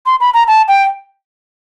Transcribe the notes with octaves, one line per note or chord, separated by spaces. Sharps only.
C6
B5
A#5
A5
G5